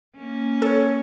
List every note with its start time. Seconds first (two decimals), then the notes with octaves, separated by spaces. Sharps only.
0.17 A#3 C#4
0.62 A4 C#5